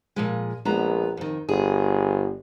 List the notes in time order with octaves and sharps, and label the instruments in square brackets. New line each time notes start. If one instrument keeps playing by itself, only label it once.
[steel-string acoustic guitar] A#2 F3 G#3
[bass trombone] A#1 [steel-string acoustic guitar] G#3 B3 A#5
[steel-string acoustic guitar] F2 D#3
[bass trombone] G1 [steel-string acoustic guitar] G#4